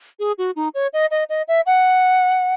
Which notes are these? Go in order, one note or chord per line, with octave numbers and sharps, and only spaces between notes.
G#4
F#4
D#4
C#5
D#5
D#5
D#5
E5
F#5